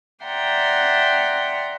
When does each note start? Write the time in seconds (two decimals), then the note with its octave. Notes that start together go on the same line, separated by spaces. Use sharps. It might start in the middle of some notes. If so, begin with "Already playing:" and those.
0.24 D5 E5 F#5 G5 A#5 C6